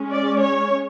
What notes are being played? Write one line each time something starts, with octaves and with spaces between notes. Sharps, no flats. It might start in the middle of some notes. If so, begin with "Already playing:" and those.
Already playing: G#3 C#4
D5
C#5